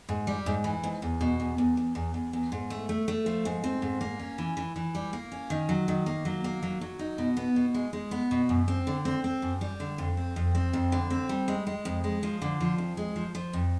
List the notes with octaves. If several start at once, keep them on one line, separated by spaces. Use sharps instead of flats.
G#2
G3
G#2
E3
G#2
E2
B2
E2
E2
E2
E2
E2
E2
G#2
A3
A3
A3
F3
G#2
C4
G#2
A#3
C#4
E3
E3
E3
G3
A#3
C#4
D#3
F#3
D#3
A#3
F#3
A#3
F#3
F#3
D#4
B2
B3
B2
G#3
G#3
B3
B2
F#2
C4
D3
C4
C4
F#2
G3
D3
F2
C4
F2
C4
F2
D3
C4
G3
G#3
G#3
F2
G#3
F3
D3
F3
F2
G#3
F3
F3
F2